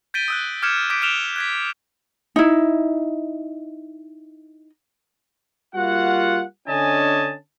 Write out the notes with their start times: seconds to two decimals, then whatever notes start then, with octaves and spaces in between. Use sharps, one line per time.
0.14 G6 A6 B6 D7 D#7 G7
0.28 D#6 E6 F#6
0.62 D6 F6 G6 G#6 C#7 E7
0.90 D6 G6 B6 D7
1.02 F6 F#6 D7 E7 F7 G7
1.36 F#6 G#6 B6
2.36 D#4 E4
5.74 G3 A#3 F4 F#4 F#5
6.67 D3 C#4 D4 D#5 G#5 A5